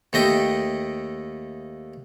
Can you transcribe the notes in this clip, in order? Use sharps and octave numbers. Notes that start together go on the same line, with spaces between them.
D#2 A3 D#5 G5